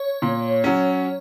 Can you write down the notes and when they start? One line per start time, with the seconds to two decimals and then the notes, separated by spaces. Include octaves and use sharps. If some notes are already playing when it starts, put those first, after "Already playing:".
Already playing: C#5
0.22 A#2
0.64 F#3 C#4